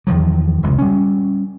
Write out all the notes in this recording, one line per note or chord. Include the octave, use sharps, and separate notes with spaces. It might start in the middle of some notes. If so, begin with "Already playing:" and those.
E2 D#3 F3 F#3
F1 C#2
G3 C#4